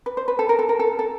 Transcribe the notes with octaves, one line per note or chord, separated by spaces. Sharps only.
B4
C5
B4
A4
A#4
A4
A#4
A4
A4